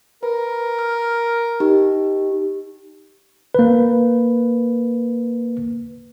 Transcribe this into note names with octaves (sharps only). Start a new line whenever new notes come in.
A#4 B4
F6
D#4 G4
A#3 B4